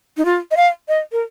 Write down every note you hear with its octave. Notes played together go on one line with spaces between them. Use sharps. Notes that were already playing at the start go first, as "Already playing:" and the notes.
D#4
F4
D#5
F5
D#5
A#4